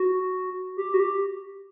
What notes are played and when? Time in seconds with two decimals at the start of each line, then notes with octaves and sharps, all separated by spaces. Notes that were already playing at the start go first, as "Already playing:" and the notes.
Already playing: F#4
0.77 G4
0.94 F#4
1.00 G4